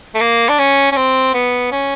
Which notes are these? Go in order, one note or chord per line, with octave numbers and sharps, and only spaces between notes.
A3
A#3
D4
C#4
C#4
C4
B3
C#4